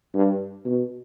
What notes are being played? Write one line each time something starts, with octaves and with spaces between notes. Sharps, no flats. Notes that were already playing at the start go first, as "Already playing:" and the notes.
G2
B2